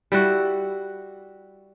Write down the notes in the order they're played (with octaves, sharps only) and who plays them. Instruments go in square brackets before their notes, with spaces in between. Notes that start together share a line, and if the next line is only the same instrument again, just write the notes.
[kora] G3 E4 F#4